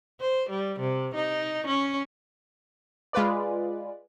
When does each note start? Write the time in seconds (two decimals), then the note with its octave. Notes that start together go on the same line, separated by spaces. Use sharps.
0.20 C5
0.49 G3
0.80 C3
1.15 D#4
1.67 C#4
3.13 G#3 F4 B4 D5